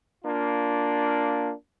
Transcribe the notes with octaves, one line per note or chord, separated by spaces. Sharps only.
A#3 D4 F4